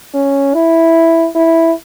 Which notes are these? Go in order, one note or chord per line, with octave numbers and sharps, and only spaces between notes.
C#4
E4
E4